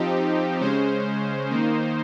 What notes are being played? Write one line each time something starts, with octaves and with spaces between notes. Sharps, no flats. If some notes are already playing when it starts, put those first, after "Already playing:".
Already playing: F3 C4 D#4 G4
C#3 G#3 C#4 C5
D#3 A#3 D#4